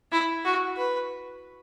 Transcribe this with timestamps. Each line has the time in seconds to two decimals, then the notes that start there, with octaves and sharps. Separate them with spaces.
0.12 E4
0.45 F#4
0.77 B4